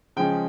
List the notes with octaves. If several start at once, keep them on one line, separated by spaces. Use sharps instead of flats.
C#3 F3 G#3 C#4 G5